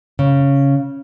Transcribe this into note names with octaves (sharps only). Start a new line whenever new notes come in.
C#3